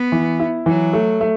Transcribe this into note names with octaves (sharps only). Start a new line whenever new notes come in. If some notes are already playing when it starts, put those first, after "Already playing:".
Already playing: B3
E3
E4
E3 F#3
A3
A3